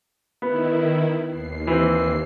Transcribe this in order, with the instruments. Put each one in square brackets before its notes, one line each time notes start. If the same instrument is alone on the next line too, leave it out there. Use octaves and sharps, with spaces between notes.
[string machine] D#3 E4 [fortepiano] B3
[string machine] D#2 C7
[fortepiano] E3 C4